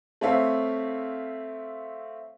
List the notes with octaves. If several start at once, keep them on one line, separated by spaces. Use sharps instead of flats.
A3 C4 C#5 E5 F5